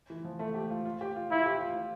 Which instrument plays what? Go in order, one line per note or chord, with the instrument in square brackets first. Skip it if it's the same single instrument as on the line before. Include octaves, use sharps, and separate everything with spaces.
[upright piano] E3
F3
A3
G4
F4
F4
G4
F4
[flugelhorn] E4 [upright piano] F4
[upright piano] G4
F4